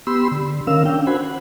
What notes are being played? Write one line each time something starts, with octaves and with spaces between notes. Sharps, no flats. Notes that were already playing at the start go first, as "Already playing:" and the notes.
B3 G4 B5 C6 E6
D3
D#3 C#4 A#4 F5 E6
C#4 D4 G5
F#4 C5 F#5 G#5 B5
F#5